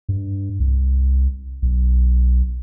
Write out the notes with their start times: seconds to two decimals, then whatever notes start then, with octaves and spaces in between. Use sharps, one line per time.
0.09 G2
0.60 C2
1.62 B1